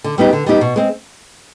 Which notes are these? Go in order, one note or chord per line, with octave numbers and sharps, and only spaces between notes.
D3
G3 B3 D#4 G4
D3
G3 B3 D#4 G4
B2
G#3 C4